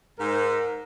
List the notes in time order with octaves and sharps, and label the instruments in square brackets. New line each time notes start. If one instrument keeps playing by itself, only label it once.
[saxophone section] G#2 [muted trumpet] A#4